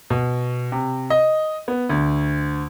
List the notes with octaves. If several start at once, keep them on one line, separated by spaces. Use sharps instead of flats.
B2
C3
D#5
B3
D2